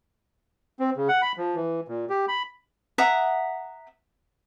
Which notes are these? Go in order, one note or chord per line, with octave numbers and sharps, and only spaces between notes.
C4
C#3
F#5
B5
F3
E3
A#2
G4
B5
E5 F#5 A#5 D#6